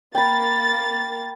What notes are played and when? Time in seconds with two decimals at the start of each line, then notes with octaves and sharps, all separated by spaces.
0.15 A#3 G5 B5 A6